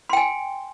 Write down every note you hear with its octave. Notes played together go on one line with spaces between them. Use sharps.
G5 G#5 C6